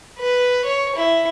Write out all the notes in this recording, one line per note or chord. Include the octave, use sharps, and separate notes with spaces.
B4
C#5
E4